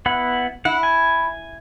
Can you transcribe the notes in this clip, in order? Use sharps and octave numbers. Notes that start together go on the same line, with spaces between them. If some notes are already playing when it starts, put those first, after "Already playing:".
B3 E4 F#5
E4 F#5
G#5